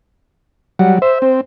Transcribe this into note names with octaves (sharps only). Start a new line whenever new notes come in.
F#3 G3 F#5
C5 E5
C4